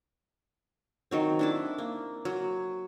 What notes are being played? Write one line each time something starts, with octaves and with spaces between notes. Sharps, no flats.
D#3 F#3 C4
D4 E4 A5
A#3
F#3